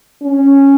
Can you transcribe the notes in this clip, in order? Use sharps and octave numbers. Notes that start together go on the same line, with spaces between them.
C#4